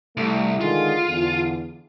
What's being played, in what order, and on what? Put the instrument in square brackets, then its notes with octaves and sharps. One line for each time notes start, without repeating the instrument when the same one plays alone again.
[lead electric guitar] C2 [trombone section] A3
[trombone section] D3 D#3 G#3 [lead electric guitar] F4
[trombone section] E2 D3